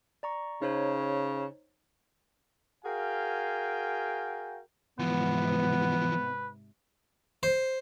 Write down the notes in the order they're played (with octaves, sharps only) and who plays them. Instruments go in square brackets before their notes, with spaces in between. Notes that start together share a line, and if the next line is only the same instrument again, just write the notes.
[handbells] D5 A#5 C#6
[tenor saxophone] C#3 [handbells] D#4 C5 C#5
[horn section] F#4 G#4 A#4 F5 G5 G#5
[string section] G#2 C3 [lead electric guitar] E3 F3 [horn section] B3 [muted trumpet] B4
[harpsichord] C5